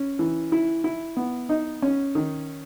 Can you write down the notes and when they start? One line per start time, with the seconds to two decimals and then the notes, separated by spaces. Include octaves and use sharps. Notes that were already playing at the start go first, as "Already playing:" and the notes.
Already playing: C#4
0.19 E3
0.52 E4
0.84 E4
1.17 B3
1.49 D#4
1.82 C#4
2.15 D#3